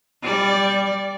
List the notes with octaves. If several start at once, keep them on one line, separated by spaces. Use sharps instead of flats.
G3 D5